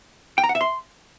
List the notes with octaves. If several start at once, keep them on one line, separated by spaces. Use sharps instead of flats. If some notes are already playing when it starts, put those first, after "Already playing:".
G5
A#5
F#5
E5
C6